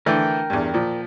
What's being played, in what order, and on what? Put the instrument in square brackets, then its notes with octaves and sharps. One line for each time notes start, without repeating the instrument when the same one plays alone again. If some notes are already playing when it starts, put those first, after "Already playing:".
[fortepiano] D3 E3 A3 [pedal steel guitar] A#4 G5
[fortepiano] E2 G2
A#2 F3